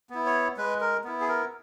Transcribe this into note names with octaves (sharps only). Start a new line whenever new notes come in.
B3 E4
C#5
G#3 B4
A#4
B3 E4
G#4
A#4